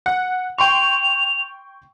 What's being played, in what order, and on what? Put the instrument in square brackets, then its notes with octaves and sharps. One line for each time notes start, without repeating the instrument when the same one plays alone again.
[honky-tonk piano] F#5
[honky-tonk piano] G5 C6 C#6 [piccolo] F7